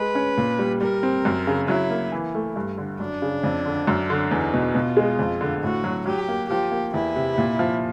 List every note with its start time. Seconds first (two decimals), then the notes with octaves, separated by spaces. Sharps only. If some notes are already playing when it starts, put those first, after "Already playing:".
Already playing: G#3 B4
0.15 C#4
0.37 A#2
0.59 G3
0.81 G3 A#4
1.03 C4
1.25 F#2
1.47 C#3
1.68 F#3 E4
1.90 A#3
2.12 E3
2.35 A3
2.56 G2
2.78 D3
3.00 F#2 D4
3.22 C#3
3.44 F2
3.65 D3
3.87 F#2
4.10 D3
4.31 E2 D#4
4.54 B2
4.75 B2 F4
4.97 G#3
5.19 F2
5.41 D3
5.63 A2 F#4
5.84 F#3
6.06 F#3 G4
6.28 A#3
6.49 F3 G4
6.72 A#3
6.94 E2 E4
7.16 C3
7.38 A#2
7.59 F3